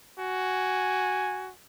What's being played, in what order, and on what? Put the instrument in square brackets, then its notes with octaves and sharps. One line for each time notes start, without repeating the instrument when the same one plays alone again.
[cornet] F#4 [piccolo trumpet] G#5